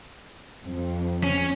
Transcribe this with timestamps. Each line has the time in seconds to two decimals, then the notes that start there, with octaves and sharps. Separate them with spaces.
0.63 F2
1.23 C#4